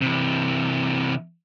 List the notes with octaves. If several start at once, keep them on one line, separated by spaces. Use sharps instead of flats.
C3 E3